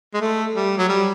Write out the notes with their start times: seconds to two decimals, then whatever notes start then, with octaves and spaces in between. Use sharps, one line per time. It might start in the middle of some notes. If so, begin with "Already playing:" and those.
0.14 G#3
0.21 A3
0.55 G3
0.78 F#3
0.89 G3